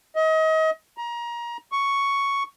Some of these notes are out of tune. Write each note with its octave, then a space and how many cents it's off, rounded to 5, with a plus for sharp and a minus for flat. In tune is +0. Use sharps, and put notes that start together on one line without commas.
D#5 +35
A#5 +25
C#6 +5